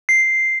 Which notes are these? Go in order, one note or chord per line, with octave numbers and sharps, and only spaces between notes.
C7